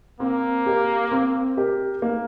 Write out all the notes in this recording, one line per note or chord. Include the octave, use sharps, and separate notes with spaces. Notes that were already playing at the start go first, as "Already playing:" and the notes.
A#3 C4
G4 A#4
C4
G4 A#4
A#3